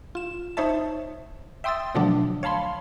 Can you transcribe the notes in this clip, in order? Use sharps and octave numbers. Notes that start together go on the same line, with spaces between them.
F4 E7
D#4 C5 C#5 E5 A5
E5 G5 C6 D#6 E6 A6
B2 D3 F3 F#3 A3 D4
C#5 F5 A5 B5 C6